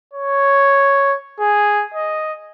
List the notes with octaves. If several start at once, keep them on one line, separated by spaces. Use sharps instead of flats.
C#5
G#4
D#5